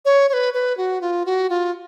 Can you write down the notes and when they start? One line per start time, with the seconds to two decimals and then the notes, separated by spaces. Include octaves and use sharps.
0.05 C#5
0.29 C#5
0.33 B4
0.54 B4
0.77 F#4
1.01 F4
1.26 F#4
1.50 F4